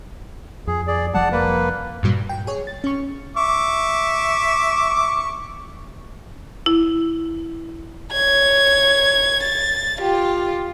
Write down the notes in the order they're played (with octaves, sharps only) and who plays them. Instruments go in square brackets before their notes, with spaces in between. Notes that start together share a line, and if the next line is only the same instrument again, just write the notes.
[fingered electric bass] F2 [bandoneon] G#4
[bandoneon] G#4 D5
[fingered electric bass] F1 F3 G3 [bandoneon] D5 F#5 A5
[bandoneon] A#3 B4
[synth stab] G2 A#2 F#3 G3
G5
G#4 C#5
A6
C#4 C#6
[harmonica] E5 C#6 D6
[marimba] E4
[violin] C#5 G#6
A6
F4 G4